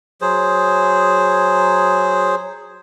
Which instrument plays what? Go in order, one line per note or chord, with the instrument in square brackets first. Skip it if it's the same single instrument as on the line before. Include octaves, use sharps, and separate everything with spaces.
[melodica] F#3 G#4 C5